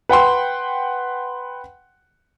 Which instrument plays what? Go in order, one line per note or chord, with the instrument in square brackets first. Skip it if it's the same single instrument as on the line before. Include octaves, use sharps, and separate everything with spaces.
[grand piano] B4 F#5 G5 C6